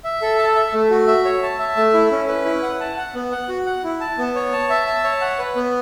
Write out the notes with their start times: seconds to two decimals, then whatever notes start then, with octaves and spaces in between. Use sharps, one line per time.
0.04 E5
0.22 A4
0.38 A5
0.56 E5
0.73 A3
0.90 F#4
1.08 E5
1.25 C#5
1.43 A5
1.59 E5
1.77 A3
1.94 E4
2.11 C#4
2.28 B4
2.45 E4
2.63 F#5
2.80 A5
2.97 F#5
3.15 B3
3.32 F#5
3.49 F#4
3.66 F#5
3.84 E4
4.01 A5
4.18 B3
4.35 C#5
4.53 A5
4.70 E5
4.87 A5
5.04 C#5
5.21 F#5
5.39 B4
5.56 B3